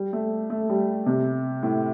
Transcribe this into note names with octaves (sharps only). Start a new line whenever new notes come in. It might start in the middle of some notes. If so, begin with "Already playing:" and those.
Already playing: G3
A3
A3
G3
C3
A2